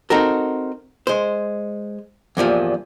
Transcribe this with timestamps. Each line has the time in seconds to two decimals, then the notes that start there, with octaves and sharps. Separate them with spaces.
0.10 C4 D#4 F#4 A4 A#4
1.07 G#3 C5
2.37 E2 G2 A#2 F3